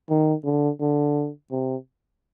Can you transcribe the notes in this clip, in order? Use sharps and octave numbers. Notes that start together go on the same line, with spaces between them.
D#3
D3
D3
C3